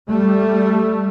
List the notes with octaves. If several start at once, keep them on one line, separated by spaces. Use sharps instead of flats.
G3 A3